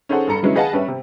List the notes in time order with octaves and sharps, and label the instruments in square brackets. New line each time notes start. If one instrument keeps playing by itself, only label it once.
[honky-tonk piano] C#4 D#4 G#4 A4 C5 F#5
G2 A4 A#5 C#7
C#3 F#3 G#3 B3 C#4 E4
G#4 B4 D#5 F5 F#5 A5
G3 C#4 B4 E5
C3